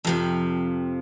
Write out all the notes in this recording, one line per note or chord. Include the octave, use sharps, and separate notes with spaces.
F2 C3 F3